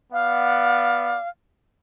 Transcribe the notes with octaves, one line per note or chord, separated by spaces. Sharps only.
B3 D5 F5 F#5